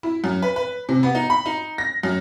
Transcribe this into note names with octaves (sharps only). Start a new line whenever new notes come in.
E4
F#2
B4
B4
C3
B3
D#4
B5
D#4
A#6
F#2